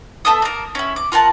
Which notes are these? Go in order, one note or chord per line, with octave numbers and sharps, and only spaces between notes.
B3 A4 E5 D#6
A#3 A#4
C#4 E4
D6
F4 A#4 F#5 A5